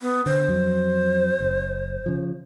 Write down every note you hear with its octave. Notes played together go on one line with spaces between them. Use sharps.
B3
D3 C5
F2 F#3
F#1
C#3 F3